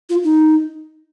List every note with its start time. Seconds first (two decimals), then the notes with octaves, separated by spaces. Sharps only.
0.10 F4
0.24 D#4